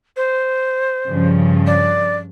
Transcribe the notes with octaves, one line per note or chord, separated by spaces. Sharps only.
C5
G2 C#3 F3
D5